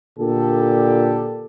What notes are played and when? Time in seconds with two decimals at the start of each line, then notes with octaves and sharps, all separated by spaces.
0.19 A#2 D3 G4 A4